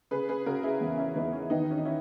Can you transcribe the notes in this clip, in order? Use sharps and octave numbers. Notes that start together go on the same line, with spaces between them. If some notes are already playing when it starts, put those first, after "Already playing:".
C#3 G#4 B4
G#4 B4
C#3 F#4 A#4
E4 G#4
E2
C#4 E4
E2 B3 D#4
C#4
D#3 B3 D#4
C#4
D#4
C#4 E4